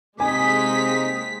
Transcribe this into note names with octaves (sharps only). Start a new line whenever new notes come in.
C3 G#3 A#3 C4 D#4 G#5 D#6 B6